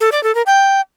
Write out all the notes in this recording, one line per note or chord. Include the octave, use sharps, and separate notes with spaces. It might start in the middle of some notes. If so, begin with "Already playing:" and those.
A4
D5
A4
A#4
G5